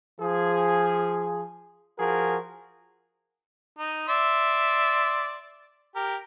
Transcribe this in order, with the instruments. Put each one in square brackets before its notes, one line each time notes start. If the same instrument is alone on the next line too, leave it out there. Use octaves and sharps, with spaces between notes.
[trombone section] F3 G#4
F3 F#4 G#4 A#4
[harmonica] D#4
D5 E5 C6
G4 A#4